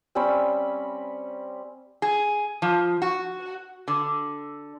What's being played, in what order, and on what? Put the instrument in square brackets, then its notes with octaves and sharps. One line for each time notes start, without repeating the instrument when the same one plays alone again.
[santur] G3 C4 C#4 B5
[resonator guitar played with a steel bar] G#4
F3
F#4
D3